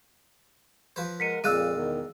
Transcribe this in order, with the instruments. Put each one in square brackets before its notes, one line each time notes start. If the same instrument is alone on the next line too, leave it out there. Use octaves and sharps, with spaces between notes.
[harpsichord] F3 B4 C5
[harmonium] G#3 A#4 F#5 [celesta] B6 C#7 D#7
[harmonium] F2 A#2 [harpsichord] G#3 D5 F5 [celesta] E6 F#6 D#7
[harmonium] E2 B2 D#3